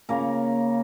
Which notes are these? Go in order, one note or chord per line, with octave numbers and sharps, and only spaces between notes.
C#3 A#3 A#4